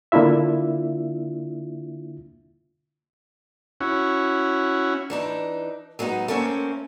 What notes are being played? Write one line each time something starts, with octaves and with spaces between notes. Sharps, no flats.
D3 A#3 D4 E4 F4 E5
C#4 E4 F#4
E3 D4 D#4
F#3 G#3 B3 C4 D#4
A3 A#3 C4 C#4